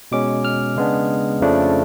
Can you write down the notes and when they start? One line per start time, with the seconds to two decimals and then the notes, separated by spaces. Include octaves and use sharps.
0.12 B2 G#3 C#4 D6
0.45 F6
0.76 C#3 G#3 B3 D4
1.41 F2 C#3 F3 A3 D4